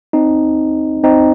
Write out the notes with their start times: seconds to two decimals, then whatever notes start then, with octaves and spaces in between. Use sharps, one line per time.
0.13 C4 D#4
1.04 C4 D#4